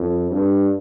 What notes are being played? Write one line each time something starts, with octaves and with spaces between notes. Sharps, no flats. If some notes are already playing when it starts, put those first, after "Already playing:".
Already playing: F2
G2